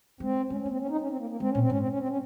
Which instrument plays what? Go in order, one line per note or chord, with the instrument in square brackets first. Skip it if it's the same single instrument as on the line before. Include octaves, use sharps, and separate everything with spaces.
[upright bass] G#3 [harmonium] C4
[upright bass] G#3 [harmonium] C#4
[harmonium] C#4
[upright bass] A#3
[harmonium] C4
C#4
D#4
C#4
C4
A#3
A#3
[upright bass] G#3 [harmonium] C4
[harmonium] C#4
[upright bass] A#2
[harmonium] C4
[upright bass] G#2 [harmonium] C#4
[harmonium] C4
C#4
C4
C#4